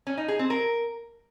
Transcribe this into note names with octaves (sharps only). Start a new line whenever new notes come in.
C#4
D#4
G#4
C4
A#4